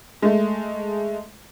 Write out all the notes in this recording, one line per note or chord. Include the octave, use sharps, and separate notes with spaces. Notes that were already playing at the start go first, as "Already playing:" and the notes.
G#3 A3